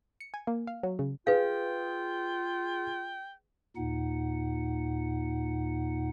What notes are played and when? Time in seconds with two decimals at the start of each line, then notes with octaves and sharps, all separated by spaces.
0.20 C#7
0.34 G#5
0.47 A#3
0.67 F5
0.83 F#3
0.99 C#3
1.27 F4 G#4 B4 F5 G5
3.76 D#2 A#2 D#4 F#5